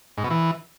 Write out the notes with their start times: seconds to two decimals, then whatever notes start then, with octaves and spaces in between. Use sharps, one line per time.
0.17 G#2
0.24 B2
0.30 E3